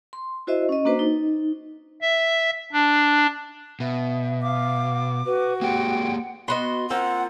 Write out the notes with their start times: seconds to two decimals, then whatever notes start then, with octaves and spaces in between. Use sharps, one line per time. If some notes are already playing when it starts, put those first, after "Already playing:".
0.13 C6
0.47 E4 F#4 C5 D#5 E5
0.69 C#4 D#5
0.85 A#3 D4 F#4 B4 C5
0.99 D#4
2.01 E5
2.73 D4
3.80 B2 E5
4.42 F5 D6
5.25 F#4 B4
5.62 A#3 G4 G#4 F#5 G5
6.48 B3 F#4 D#5 C6
6.90 A#3 C4 F4 F#5